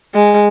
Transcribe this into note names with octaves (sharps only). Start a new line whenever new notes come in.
G#3